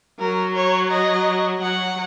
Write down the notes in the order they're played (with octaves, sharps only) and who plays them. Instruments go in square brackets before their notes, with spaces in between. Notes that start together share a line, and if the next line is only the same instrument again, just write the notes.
[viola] F#3 [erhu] A#4
[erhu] C#5
D#5
[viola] F#3 [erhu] F#5